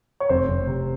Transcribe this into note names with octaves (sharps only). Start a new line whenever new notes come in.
C#5
F1 C4 C5
F1
C3